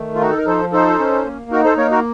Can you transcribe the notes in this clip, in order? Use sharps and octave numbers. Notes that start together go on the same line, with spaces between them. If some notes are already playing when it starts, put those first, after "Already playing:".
Already playing: D#3 A3
F4
D#4 F#4
A4
A#4
F3 A4 C5
D#4 A4 C5
C#4
A#3
D#4 F#4 A#4
A4 C5
A#3 A#4 C#5
F#4 A#4